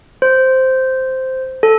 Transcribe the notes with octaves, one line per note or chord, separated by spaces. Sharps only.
C5
A4